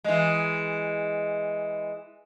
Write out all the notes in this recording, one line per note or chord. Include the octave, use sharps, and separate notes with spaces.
E3 G#3